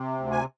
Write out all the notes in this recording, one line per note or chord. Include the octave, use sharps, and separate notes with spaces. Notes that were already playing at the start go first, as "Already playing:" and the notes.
Already playing: C3
D2
G#5